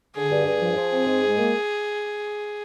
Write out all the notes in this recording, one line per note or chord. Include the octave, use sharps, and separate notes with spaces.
D3 G#4
G2
G2
F3
F3
C4
G#2
G#3
A#3